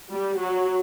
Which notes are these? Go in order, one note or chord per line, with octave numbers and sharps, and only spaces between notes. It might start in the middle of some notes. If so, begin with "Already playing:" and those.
G3
F#3